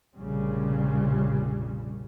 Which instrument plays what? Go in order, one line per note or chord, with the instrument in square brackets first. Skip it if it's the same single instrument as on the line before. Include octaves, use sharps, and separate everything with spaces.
[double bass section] F1 A#1 A#2 C#3 G3